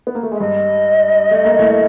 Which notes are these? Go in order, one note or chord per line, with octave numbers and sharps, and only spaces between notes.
B3
A#3
A3
G#3 E5
G2 G3 D#5
A3
A#3
A2 A3